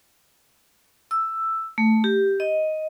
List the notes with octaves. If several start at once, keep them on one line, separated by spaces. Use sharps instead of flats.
E6
A3
G4
D#5